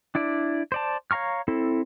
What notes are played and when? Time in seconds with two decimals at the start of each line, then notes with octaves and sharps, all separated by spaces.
0.15 D4 E4 D5
0.72 C5 D5 A5
1.11 C#5 F5 A#5 C#6 F6
1.48 C4 E4 A4